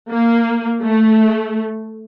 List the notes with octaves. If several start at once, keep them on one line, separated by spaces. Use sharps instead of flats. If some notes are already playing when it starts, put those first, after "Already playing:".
A#3
A3